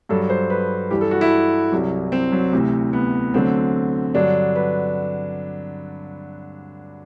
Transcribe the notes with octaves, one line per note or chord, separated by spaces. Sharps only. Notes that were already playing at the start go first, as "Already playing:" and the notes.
G2 F#3 A4
C5
B4
G2 E3 G4
A4
F#4
E4
C2 C3 F#3
C4
F#3
D2 C3 E3
B3
D2 D3 F#3 C4
G2 D3 F#3 D4
B4